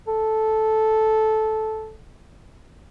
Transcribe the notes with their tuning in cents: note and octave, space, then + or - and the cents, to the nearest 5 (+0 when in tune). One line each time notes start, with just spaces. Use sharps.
A4 -10